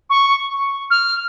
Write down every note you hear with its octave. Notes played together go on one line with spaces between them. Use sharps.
C#6
F6